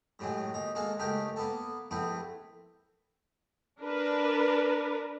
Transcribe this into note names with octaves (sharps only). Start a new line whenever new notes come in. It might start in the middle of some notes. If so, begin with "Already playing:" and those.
A2 C3 F#3 G#3
D#2 D#4
G#3 A#3 F#4 A4 F5
C#2 A3 D#4 G4 A#4
A#3 B3 A4
A#1 A3 B3 C4 E4
D4 A#4 B4